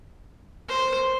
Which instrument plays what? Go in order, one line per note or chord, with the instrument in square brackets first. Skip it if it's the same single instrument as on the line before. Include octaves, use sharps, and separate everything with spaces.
[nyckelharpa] C5